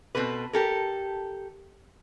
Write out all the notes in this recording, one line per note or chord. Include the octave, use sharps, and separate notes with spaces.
B2 A3 C4 A4 B4
G4 A4 A#4